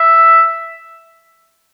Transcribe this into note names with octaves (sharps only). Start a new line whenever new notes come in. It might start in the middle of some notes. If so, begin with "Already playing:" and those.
Already playing: E5